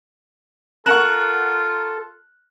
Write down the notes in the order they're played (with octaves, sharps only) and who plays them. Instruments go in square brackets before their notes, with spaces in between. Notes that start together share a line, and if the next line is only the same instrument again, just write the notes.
[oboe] F4 [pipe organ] A4 [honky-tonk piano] A#4 F#5 C#6 [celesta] F#6 E7 F#7